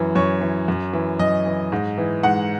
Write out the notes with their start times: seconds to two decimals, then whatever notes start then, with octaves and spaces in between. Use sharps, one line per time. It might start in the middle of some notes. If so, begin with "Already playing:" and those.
Already playing: F#2 E3
0.15 F#2 C#5
0.41 E3
0.68 F#2
0.93 E3
1.19 F#2 D#5
1.46 E3
1.72 G#2
1.98 E3
2.23 G#2 F#5